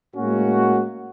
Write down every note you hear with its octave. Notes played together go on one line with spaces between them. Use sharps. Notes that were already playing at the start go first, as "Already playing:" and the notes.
A2 G#3 A#3 C#4 F#4